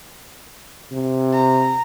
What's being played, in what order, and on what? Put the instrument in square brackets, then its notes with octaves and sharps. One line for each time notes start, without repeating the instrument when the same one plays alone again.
[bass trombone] C3
[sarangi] A#5